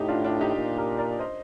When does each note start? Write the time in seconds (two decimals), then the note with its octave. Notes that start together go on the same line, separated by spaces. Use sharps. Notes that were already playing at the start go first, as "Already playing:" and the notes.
Already playing: A2 D#4 G4
0.08 D4 F4
0.24 D4 F4
0.41 D#4 G4
0.56 A#2
0.78 G4 A#4
0.98 A#4 D5
1.19 C5 D#5